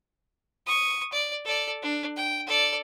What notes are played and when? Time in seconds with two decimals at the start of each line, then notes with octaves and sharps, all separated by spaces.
0.67 C#6 D#6
1.12 D5
1.45 A4 D5
1.82 D4
2.17 G5
2.47 A4 D5